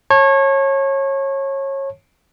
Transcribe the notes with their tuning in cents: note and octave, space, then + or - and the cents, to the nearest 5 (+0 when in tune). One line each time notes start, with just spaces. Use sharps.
C#5 -25 A5 +0